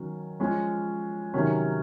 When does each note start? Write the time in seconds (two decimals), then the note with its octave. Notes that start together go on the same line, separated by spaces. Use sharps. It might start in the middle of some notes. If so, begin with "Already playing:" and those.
Already playing: D#3 F#3 C#4
0.40 F3 G#3 C#4
1.34 C3 D#3 F#3 C#4